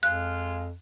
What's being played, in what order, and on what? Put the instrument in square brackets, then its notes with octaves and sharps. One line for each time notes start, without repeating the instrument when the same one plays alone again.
[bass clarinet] F2 [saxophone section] G#3 F4 F5 [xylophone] F#6